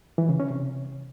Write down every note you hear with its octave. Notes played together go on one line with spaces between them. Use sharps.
E3
C#3
C#4
C3